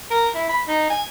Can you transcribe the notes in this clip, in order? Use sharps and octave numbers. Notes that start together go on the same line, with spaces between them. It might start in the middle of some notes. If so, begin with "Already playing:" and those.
A#4
E4
B5
D#4
G#5